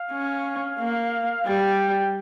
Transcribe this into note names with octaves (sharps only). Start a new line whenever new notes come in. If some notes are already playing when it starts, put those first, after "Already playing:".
Already playing: F5
C#4
A#3
G3 G5